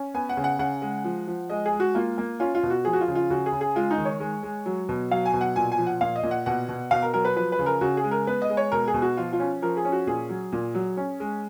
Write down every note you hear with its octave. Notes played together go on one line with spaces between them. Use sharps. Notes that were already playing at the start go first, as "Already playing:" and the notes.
Already playing: C#4
B3 G#5
F#5
C#3
F#5
C#3 F#5
G#3
F3
F3
G#3 D#5
G#4
G#3
F#4
A#3 F4
A#3
C#4 F4
F4
B2
F#4
F3 G#4
F#4
F4
C#3
F4
C#3 F#4
G#4
C#3
G#4
G#3 F4
D#4
D#3
C#5
G#3
G#3
F#3
B2
F#3 F5
G#5
B2
F#5
A#2 G#5
G#5
F3
F#5
A#2 F5
D#5
A#2
F#5
B2 F#5
B2
B2 F5
A#4
F#3 A#4
B4
F3 B4
B4
C#3
A#4
C#3 F#4
G#4
G#3
A#4
B3 B4
D#5
G#3
C#5
B2 A#4
G#4
B2
F#4
F3 F4
F4
C#4
F3 A#4
G#4
C#4
F#4
A#2 G#4
F#3
A#2
F#3
C#4
G#3